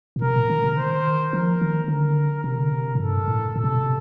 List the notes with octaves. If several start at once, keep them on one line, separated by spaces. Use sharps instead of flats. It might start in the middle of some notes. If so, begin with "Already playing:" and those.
A#2
C3 A#4
A#2
D#3
C3
D3
D#3 C5
F3 A#4
D#3
D3 A#4
C3 A#4
D3
C3
A2
G2 A4
A2
A#2 A4
C3
A#2
C3